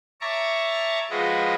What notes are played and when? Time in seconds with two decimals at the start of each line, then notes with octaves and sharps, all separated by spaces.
0.21 C#5 E5 A5 A#5 C#6 D6
1.11 F3 G#3 F4 F#4 B4 D#5